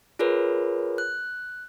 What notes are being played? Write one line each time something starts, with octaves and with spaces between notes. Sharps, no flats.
F4 G#4 A#4 B4 C#5
F#6